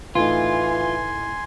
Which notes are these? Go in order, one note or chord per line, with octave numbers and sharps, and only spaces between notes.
A2 E3 A3 D#4 F4 G#5 C6